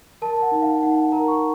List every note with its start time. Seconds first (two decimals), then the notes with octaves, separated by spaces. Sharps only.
0.22 A#4 A5
0.36 A5
0.42 F#5
0.52 D#4
0.62 F5
0.83 D#4 F#5
1.12 A#4 A#5
1.28 C#6